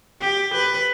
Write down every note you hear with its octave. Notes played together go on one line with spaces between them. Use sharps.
G4
B4